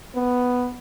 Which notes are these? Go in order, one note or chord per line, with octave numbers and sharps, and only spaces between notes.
B3